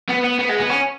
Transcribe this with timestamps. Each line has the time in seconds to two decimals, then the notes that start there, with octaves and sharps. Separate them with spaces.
0.09 B3
0.24 B3
0.39 B3
0.49 G#3
0.59 B3
0.70 C#4